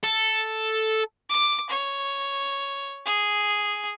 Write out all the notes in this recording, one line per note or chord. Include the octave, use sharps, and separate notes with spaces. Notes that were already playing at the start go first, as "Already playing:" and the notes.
A4
D6
C#5
G#4